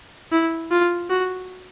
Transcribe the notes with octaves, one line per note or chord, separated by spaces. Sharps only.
E4
F4
F#4